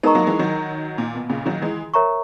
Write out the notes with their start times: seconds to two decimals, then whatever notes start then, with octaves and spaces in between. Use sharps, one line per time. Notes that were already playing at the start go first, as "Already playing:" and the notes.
0.03 G#3 B3 D#4 A#4 D#5 A#5 C#6
0.15 F#3 A#3
0.27 E3 G#3
0.39 D#3 F#3
0.98 A#2
1.15 B2
1.30 A#2 C#3
1.46 D#3 F#3
1.62 E3 G#3
1.94 A#4 C#5 E5 A#5 C#6